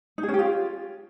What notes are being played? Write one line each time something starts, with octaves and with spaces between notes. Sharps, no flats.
D#4
G#4
C#4
G4
F4